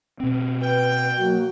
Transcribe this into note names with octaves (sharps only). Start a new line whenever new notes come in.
B2 C4
B4 G5
F#3 A#3 F#4